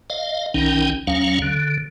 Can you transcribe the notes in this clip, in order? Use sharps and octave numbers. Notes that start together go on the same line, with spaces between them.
D#5 F5
B1 D#3 C#4 D#4 G5
D#2 F#3 C#4 F5
D3